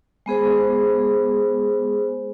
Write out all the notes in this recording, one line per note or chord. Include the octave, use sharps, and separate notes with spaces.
G#3 B3 G#4 C5